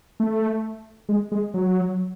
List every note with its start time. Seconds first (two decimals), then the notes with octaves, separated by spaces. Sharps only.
0.20 A3
1.09 G#3
1.32 G#3
1.54 F#3